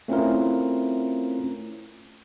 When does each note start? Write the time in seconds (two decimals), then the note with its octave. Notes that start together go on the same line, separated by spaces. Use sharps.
0.08 A3 C4 C#4 E4 F4 A#4